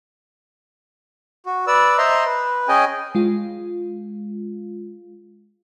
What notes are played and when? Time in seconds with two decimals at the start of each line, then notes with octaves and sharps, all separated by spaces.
1.46 F#4
1.67 B4 D5 E6
1.98 C5 D#5 E5 A#5 C6
2.25 B4
2.68 C#4 G#4 D#5 G5 G#5
3.15 G#3 F4